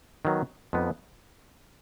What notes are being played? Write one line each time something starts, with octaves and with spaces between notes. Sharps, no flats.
D#3 F#3 B3
F2 F3 B3 D#4